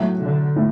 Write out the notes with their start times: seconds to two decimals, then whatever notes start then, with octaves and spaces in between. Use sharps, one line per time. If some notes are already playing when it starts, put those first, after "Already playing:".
Already playing: A2 F#3 A3 F#4
0.22 D3
0.56 A2